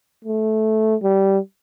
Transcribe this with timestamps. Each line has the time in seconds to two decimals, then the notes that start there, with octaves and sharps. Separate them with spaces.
0.25 A3
1.03 G3